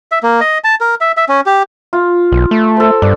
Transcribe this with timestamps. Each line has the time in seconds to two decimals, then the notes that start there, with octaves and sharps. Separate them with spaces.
0.12 E5
0.23 A#3
0.41 D#5
0.64 A5
0.81 A#4
1.01 E5
1.17 E5
1.29 C#4
1.46 G4
1.93 F4
2.32 B1
2.51 A3
2.77 A4 C5
3.02 G2 D4